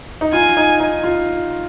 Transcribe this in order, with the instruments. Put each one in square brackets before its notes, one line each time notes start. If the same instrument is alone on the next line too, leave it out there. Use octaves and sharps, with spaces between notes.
[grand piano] D#4
[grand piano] F4 [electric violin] G#5
[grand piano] D#4
D#4
F4